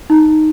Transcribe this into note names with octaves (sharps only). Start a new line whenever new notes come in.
D#4